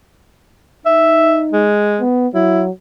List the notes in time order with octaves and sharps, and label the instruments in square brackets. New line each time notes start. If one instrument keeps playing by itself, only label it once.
[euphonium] D#4 [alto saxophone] E5
[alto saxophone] G#3
[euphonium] B3
[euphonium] F#3 [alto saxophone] E4